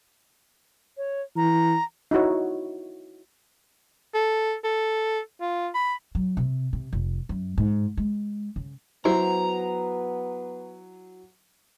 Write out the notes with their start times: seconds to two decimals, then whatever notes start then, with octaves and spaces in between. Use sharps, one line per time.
0.97 C#5
1.37 E3 A#5
2.11 D#4 E4 F#4 C#5
4.14 A4
4.64 A4
5.41 F4
5.74 B5
6.15 F#3
6.37 C3
6.73 C3
6.93 F1
7.29 F#2
7.58 G#2
7.97 G#3
8.56 C#3
9.05 F#3 B3 E4 C5 A#5